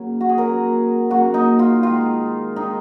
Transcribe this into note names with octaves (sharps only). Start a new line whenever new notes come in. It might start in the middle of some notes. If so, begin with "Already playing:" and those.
Already playing: C#3 F#3 A#3
F#4
G#4
C#3 F#3 A#3 A#4
C#3 F#3 A#3 F#4
D#4
F4
D#3 G#3 F4
D#3 G#3 D#4